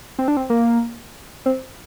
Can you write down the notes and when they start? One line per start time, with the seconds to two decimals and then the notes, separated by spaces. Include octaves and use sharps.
0.19 C4
0.28 D4
0.37 C4
0.50 A#3
1.46 C4